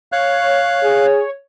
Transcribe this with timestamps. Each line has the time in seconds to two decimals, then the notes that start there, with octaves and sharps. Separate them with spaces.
0.12 C#5 F5 F#6
0.83 G#4